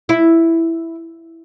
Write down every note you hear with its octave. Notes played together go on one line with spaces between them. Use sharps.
E4